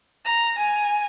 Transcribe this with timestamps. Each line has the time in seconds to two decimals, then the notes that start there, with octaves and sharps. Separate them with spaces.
0.25 A#5
0.58 G#5